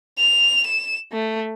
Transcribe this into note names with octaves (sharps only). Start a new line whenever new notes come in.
F7
E7
A3